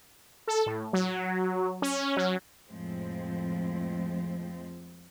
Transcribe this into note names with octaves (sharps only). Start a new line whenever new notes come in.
A4
A2
F#3
C#4
F#3
F2 A2 F3 G#3 C4